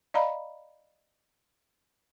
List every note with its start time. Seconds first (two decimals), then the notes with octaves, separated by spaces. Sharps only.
0.14 D5 D#5 F5 A#5 B5